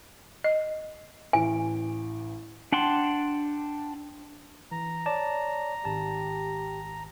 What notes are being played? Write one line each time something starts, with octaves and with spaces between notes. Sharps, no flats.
D#5
A1 G#5 D7
D4 F#5 G5 A5 C6
E3 A#5
C#5 D5 A5
G#1 G4 A5